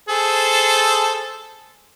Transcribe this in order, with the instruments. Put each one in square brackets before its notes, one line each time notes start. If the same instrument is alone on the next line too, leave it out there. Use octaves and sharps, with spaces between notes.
[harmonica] G#4 A4 C5